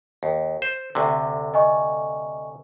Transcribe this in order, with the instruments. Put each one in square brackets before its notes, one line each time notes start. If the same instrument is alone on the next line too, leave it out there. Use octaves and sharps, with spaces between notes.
[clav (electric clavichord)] D#2
C5
D2 C3
[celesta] D#5 G#5 C#6